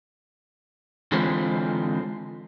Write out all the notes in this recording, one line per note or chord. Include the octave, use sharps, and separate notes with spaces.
D3 E3 G#3 C4 F4 B4